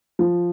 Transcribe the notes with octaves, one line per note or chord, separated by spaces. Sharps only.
F3